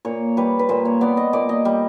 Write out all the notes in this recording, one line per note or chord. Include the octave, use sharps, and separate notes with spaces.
A#2 C#5
G3 B4
B4
A#2 C5
C#5
B3 D5
D#5
A#2 D5
D#5
G3